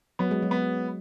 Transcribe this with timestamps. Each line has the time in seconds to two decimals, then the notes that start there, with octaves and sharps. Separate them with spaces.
0.19 F#3 B3
0.31 G#3
0.42 F#3
0.51 B3